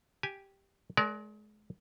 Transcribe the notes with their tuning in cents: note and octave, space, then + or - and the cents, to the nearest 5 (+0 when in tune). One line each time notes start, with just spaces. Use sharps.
G4 +0 G#5 +0
G#3 +35 A#4 +0 D5 -30